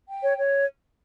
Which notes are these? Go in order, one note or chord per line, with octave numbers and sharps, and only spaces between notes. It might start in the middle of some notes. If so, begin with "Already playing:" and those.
G5
C#5
C#5